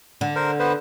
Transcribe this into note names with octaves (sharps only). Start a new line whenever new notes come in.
D3
A#4 C5
B3 B4 C5